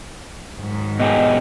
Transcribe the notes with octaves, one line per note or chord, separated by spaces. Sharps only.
G#2 D#3 F#3
B2 G4 G#4 D#5